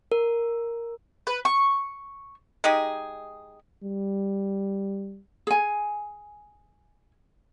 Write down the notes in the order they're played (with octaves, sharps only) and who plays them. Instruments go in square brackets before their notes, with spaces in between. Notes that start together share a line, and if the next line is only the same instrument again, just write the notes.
[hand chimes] A#4
[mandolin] B4
C#6
[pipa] G#3 D#4 G4 G#4
[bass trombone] G3
[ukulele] G#4 G#5